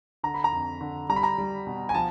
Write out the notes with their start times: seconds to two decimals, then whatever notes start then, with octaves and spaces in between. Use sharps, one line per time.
0.23 D3 A#5
0.34 B5
0.44 A#5
0.52 F2
0.81 D3
1.09 G3 A#5
1.16 B5
1.23 A#5
1.38 G3
1.67 B2
1.89 G#5
1.94 F3 A5